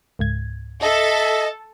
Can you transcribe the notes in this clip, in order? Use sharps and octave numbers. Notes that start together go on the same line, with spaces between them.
C#2 G#2 G#6
A4 D#5 E5